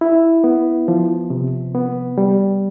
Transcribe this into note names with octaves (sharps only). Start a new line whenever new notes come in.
E4
B3
F3
C3
B3
G3